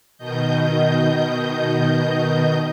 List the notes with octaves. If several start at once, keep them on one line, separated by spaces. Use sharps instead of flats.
B2 D#3 D#5 G6